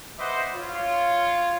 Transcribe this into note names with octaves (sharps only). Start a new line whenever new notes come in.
B4 C5 D#5 E5 F#5 D6
F4 C#5